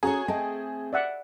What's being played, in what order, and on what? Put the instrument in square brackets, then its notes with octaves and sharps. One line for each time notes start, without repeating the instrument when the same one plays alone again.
[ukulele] C#4 A#5 [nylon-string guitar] F#4 A4 C#5 [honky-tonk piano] G#4
[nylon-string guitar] A3 C4 G5 [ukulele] D#5 A5
[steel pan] D5 E5 F#5